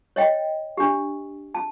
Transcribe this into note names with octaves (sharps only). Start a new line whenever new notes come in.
C#5 D#5 G5
D4 G4
A5